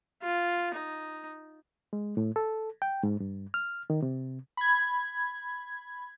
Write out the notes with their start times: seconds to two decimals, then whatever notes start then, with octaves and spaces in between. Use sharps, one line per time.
0.22 F4
0.74 D#4
1.93 G#3
2.17 A2
2.36 A4
2.82 G5
3.03 G#2
3.20 G2
3.54 F6
3.90 D#3
4.02 C3
4.57 B5 G#6